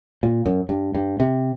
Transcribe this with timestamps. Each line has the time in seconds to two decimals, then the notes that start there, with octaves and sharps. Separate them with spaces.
0.23 A#2
0.46 F#2
0.69 G2
0.95 G2
1.20 C3